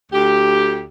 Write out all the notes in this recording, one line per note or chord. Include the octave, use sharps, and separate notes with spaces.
D2 G4